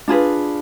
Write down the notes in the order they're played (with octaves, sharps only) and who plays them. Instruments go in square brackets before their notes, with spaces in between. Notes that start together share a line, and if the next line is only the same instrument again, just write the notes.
[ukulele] D4 F4 G#4 B4